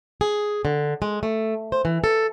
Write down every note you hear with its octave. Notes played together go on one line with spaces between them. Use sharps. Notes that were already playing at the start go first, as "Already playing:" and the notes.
G#4
D3
G#3
A3
C5
E3
A4